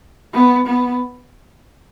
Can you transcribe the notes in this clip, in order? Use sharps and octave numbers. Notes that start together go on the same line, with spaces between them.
B3
B3